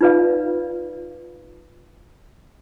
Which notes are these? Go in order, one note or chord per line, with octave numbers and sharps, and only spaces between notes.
D#4 F4 B4 D5 F5